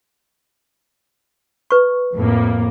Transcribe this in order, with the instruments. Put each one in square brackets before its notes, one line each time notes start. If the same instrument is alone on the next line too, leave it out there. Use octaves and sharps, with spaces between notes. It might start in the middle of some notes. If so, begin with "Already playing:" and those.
[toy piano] B4 C#6
[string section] F2 A2 A#3